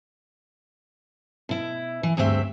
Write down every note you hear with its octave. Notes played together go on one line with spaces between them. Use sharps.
B2 E4
E3
D2 G2 G#3 C4 E5